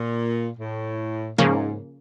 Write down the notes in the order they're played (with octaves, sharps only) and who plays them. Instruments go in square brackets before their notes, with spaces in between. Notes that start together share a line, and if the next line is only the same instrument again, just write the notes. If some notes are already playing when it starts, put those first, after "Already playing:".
Already playing: [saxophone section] A#2
A2
[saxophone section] G#2 [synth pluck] C#3 F3 A#3 C#4